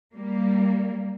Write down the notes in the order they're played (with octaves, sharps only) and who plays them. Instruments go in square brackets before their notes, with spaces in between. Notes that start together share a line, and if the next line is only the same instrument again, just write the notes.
[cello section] G3 A#3